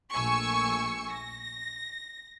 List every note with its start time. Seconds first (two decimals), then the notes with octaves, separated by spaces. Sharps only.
0.13 A#1 A3 G#5 C#6 E6 C#7
1.12 A#6